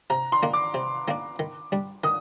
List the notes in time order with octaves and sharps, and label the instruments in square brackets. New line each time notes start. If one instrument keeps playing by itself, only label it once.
[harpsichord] C3 [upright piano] A#5
[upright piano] C6
[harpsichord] D#3 A#3 D4
[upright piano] D6
[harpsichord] C3
D#3 A#3 D4
D#3
G3 D4
[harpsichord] D#3 [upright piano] D#6